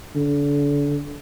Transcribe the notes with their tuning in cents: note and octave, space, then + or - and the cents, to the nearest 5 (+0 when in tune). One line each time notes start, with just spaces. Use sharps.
D3 -35